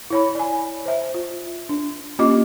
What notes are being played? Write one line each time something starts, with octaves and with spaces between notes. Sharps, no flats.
E4 C#5 B5
D5 G#5
C5 E5
F4
D4
A#3 C#4 F4 G4 D#5 D6